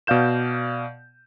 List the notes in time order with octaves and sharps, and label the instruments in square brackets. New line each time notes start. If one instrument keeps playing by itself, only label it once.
[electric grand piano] B2 D5 F5 G6 E7